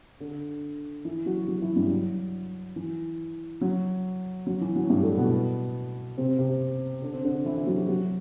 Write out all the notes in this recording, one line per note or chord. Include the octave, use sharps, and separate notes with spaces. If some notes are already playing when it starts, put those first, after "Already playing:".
D3 D4
E3 E4
F#3 F#4
F#3 F#4
E3 E4
G2 G3
F#3
E3
F#3
F#3
E3
F#3
G2 G3
A2 A3
B2 B3
C3 C4
C3 C4
D3 D4
C4
D3 D4
E3 E4
E4
F#3 F#4
G4
F#3 F#4